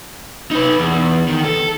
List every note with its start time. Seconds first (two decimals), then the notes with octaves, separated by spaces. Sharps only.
0.51 D#4 B4
0.79 E2
1.28 D#3
1.44 A4